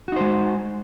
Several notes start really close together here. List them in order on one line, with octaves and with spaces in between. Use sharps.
F#4 D#4 C5 G#3